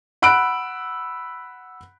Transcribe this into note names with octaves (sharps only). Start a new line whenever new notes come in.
F#5 B5 E6 F#6 D7